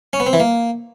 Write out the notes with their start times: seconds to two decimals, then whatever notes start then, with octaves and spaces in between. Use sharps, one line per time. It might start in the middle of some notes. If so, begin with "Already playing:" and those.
0.13 C#4
0.20 B3
0.27 C4
0.33 E3
0.40 A#3